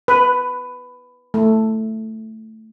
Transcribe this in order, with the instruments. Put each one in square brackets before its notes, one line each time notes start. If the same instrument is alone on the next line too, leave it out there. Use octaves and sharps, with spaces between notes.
[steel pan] B4
A3